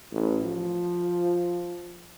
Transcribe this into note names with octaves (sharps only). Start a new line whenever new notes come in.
A1
F3